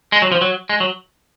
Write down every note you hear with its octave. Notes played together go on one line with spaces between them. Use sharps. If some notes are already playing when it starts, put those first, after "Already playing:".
G#3
F#3
F3
F#3
G#3
F#3